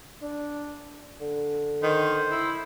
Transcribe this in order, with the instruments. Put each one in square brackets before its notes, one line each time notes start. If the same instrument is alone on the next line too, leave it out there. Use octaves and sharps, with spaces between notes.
[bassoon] D4
D3
[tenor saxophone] D#3 [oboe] C5
[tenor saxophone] E4